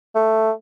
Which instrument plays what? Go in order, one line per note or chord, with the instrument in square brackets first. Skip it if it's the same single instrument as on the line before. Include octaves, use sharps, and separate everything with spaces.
[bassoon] A3